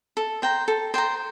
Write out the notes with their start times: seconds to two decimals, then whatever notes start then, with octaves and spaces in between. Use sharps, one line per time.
0.17 A4
0.42 C5 G5 A#5
0.68 A4
0.94 C5 G5 A#5